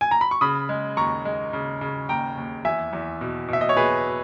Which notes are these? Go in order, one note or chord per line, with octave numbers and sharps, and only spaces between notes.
G#5
A#5
B5
C#6
C#3 B5 D#6
G#3
D#2 A#5 C#6
G#3
C#3
C#3
D#2 G5 A#5
D#2
E2 E5 G#5
E2
B2
B2 E5
D#5
C#5
B2 G#4 B4